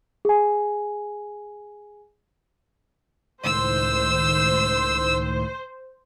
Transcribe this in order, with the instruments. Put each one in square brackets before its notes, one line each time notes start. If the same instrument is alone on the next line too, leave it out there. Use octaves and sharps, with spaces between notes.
[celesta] G#4 G#5
[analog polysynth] C#2 A2 D#3 [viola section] C5 [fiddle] E6